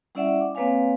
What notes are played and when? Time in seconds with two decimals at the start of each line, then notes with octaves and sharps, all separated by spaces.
0.15 G3 C#4 E4 D5 E5 F#5
0.41 D6
0.55 A#3 C4 B4 C#5 F5 G#5